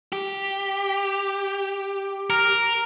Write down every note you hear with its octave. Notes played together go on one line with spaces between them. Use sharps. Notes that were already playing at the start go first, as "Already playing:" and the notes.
G4
A#4